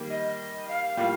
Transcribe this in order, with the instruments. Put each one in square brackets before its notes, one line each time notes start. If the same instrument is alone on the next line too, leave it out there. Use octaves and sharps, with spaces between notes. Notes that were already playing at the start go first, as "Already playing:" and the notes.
Already playing: [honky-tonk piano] D#3 G3 A#3
[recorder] D#5
F5
[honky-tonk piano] A2 G3 A#3 F4 [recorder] F5